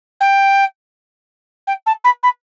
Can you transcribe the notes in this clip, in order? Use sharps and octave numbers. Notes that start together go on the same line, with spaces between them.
G5
G5
A5
B5
B5